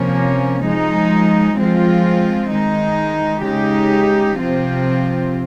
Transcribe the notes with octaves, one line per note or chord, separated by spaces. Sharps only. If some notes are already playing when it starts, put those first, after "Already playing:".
Already playing: C3 F3 A#3 C#4
F3 G#3 D#4
F3 G#3 C4 F4
D#3 G#3 D#4
C#3 G#3 D#4 G4
C3 F3 C4 F4